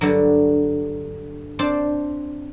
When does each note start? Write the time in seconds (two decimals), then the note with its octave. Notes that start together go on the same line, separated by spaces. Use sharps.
0.01 G2 D3 F#3
1.59 C4 D4 C5 A5